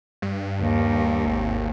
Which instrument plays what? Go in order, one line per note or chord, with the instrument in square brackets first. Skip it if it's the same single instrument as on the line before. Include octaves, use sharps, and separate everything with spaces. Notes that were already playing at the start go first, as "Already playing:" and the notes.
[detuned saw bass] G2
[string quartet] D#2
[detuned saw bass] G#1